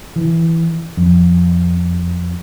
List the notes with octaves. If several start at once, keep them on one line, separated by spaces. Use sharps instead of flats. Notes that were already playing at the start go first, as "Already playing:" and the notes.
E3
F2